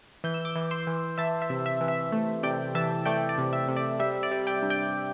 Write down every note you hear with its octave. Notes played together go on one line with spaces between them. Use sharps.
E3 G6
E6
D6 G6
E3
C6 E6
E3
E3 E5 A5
E5
C3
E5
E3
E5
A3
C3 D5 G5
E3 E5 A5
A3 D5 G5
D5
C3
E5
C3
D5
G3 E5
D5
G3
D5 G5
G2
D5 G5